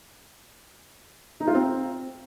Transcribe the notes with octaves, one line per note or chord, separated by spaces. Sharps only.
D#4
F4
C4